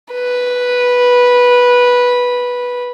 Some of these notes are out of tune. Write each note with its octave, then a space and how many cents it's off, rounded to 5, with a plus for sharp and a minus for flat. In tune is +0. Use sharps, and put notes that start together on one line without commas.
B4 -10